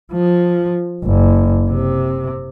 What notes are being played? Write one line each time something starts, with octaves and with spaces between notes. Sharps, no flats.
F3
F#1
C3